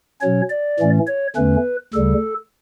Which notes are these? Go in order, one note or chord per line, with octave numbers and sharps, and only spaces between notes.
B2 F#3 C#4 C#5
D5
A2 E3 A3 C#4
C#5
E2 D3 A3 C#4 B4
D2 C#3 G3 A4